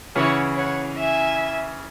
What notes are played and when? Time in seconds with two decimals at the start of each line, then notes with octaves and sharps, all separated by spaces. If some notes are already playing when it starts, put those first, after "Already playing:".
0.15 C#3 E3 C#4 E4 C#5 F#5
0.57 C#5 F#5
0.99 E5 G#5